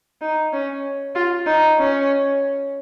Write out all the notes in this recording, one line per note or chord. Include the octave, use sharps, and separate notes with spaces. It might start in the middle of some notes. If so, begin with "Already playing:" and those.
D#4
C#4
F4
D#4
C#4